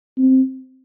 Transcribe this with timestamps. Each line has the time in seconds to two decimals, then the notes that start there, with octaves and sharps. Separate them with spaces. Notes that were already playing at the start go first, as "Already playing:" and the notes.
0.18 C4